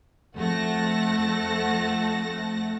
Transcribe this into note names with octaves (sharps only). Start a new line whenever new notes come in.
F2 A3 F#5 A5 A#6